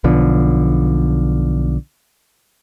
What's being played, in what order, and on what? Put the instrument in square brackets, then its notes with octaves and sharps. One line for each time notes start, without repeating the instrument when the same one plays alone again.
[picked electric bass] B1 B2 D3 F3